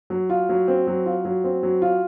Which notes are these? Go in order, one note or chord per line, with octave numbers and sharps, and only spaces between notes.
F#3
F4
F#3
C4
F#3
F4
F#3
C4
F#3
F4